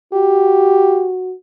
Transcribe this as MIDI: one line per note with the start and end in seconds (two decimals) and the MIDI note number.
0.13 1.35 66
0.13 1.08 67